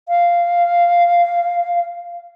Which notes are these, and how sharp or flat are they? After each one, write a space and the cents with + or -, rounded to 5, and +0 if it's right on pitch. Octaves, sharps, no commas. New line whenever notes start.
F5 -5